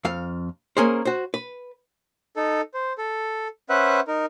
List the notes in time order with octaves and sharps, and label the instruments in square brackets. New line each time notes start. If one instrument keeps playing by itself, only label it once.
[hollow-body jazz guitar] F2 F5
A#3 C#4 G#4 A#4 C5
F#4 C5
B4
[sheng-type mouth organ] D#4 A4
C5
A4
C#4 B4 C5 E5 F#5 F#6
D#4 A#4